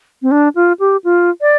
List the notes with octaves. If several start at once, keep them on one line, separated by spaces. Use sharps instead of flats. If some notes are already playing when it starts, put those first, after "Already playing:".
C4
D4
F4
G4
F4
D5